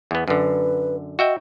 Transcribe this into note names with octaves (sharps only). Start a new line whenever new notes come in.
E2 B3
F#2 D3 B4
F#4 D#5 E5 G5